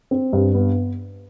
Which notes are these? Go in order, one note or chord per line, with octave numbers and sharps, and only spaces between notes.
C4
G2
B3